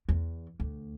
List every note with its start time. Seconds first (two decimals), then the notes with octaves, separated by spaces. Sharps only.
0.09 E2
0.60 D2